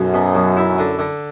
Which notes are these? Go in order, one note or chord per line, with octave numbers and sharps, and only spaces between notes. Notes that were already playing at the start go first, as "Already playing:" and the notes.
Already playing: B1 F#2
B2
B1
E4
D3
D3